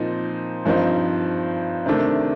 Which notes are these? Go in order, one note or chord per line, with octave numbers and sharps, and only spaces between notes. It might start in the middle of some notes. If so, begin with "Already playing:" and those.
Already playing: A#2 F3 C4 D#4
G2 F3 C4 D#4
C3 D#3 A3 D4